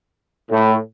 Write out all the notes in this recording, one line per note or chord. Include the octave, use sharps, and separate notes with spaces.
A2